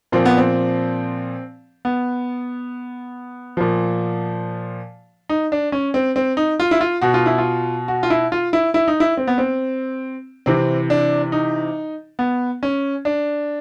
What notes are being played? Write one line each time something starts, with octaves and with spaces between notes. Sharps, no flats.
A#2 F3 C4
B3
C4
B3
A#2 F3
D#4
D4
C#4
C4
C4
D#4
F4
E4
F4
B2 F#4
F4
E4
F4
F#4
F4
E4
F4
E4
E4
D#4
E4
C4
B3
C4
C3 E3 C4
D4
D#4
B3
C#4
D4